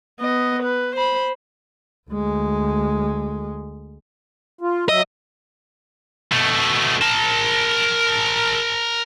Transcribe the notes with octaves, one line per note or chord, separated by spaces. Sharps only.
B3 D#5
B4
C5 B5
D2 G#3
F4
F#3 D#5 E5
B2 A3
A#4 A5